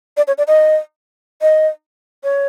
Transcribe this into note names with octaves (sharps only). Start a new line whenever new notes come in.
D5
C#5
D5
D#5
D#5
C#5